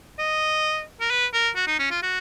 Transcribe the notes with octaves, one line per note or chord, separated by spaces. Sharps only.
D#5
A#4
B4
A#4
F#4
D#4
C#4
F4
F#4